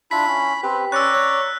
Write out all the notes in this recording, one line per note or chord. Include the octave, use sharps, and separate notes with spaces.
D4 E4 F4 B5 B6
C#4
C4 G4 B4
C#4 D5 A#5 C#6 E6 F#6
C#5